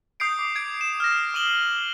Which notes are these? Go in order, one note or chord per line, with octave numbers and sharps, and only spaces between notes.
D#6 G6 C7 D7
D6
G#6 D7
E7
F6 A#6
D#6 D#7 F#7 G7